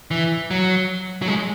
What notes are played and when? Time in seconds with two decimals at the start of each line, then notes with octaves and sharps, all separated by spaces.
0.11 E3
0.51 F#3
1.22 F#3
1.28 G#3